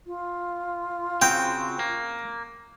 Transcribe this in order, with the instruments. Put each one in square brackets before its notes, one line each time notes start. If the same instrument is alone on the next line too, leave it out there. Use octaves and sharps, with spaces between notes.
[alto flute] F4
[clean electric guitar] C#3 C4 F#4 [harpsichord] G5
[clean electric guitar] A#3